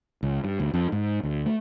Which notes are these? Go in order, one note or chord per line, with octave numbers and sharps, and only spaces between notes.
C#2
G2
D2
F2
G#2
D2
A3